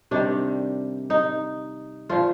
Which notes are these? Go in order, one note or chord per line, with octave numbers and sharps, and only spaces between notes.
C3 D#3 G3 D4
D#4
A#2 F3 F4